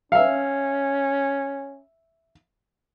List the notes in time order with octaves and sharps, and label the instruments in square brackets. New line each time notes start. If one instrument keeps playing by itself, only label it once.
[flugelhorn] C#4 [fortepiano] E5 F5